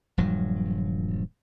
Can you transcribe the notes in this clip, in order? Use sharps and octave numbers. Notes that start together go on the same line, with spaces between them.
D#1 G2 F3 F#3